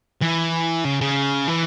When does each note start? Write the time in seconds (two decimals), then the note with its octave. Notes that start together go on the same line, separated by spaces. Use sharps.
0.22 E3
0.85 C#3
1.01 C#3
1.48 E3